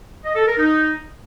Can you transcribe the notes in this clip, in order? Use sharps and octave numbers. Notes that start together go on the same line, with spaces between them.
D#5
A4
A#4
D#4